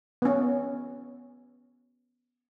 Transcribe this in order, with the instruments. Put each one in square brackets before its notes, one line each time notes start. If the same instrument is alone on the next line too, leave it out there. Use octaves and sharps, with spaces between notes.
[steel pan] B3 C#4